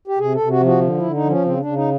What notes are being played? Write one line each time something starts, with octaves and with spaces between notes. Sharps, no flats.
G4
C3 G#4
A4
C3
F#4
F3
F#4
D3
D3 E4
D#4
F3
C#4
C#3 C4
C#3 D4
D#4